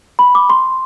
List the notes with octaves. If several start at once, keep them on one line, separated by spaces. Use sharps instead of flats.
B5
D6
C6